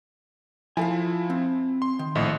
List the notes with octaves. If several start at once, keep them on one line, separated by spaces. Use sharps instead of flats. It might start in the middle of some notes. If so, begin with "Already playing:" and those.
F3 E4 F4 A4 G#5
C4
C6
D#3
A#1 A2 D#5